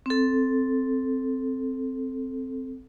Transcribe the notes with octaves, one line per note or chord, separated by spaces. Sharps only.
C4 A4